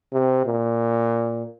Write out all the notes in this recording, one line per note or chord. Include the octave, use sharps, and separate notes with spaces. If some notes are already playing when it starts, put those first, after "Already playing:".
C3
A#2